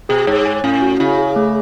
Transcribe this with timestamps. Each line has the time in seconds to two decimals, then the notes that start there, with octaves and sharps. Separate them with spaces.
0.09 B2 G#4
0.27 G#2 C#5
0.46 G#5
0.64 A2 C#4
0.82 F#4
0.99 C#3 E4
1.18 G#4
1.36 A3